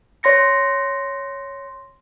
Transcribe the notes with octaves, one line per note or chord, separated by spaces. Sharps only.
C#5 C6 A#6 C#7